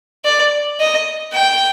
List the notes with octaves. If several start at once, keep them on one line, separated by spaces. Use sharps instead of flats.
D5
D#5
G5